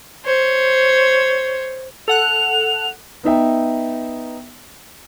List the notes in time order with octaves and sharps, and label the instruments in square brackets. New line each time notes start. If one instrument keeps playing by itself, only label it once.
[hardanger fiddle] C5 C#5
[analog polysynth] A4 F#5 F#6 [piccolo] F7
[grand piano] B3 D#4 E5 G5